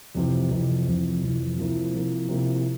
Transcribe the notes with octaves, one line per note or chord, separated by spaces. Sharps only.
F2 C3 E3
F2 C3 E3
F2 C3 E3
F2 C3 E3
C3 F3 A#3 E4
C3 F3 A#3 E4
C3 F3 A#3 E4